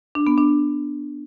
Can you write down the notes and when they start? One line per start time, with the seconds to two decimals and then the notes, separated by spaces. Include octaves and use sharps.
0.15 D4
0.27 B3
0.38 D4